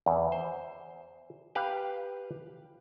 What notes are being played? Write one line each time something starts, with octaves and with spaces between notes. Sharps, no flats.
E2
C5
G4 B4 F5